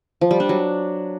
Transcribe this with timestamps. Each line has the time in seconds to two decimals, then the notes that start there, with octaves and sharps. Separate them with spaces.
0.21 F3
0.31 G3
0.40 D4
0.49 F#3